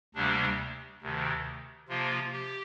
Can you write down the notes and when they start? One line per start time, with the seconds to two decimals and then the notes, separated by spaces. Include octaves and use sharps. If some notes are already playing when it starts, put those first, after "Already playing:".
0.14 D2 C3 G3 A#3 D4
1.01 D2 C3 D#3
1.88 C3 F3 A#3 F4
2.32 G4